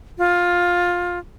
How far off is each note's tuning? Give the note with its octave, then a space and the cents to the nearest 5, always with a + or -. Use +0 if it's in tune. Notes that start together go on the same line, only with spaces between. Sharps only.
F4 +15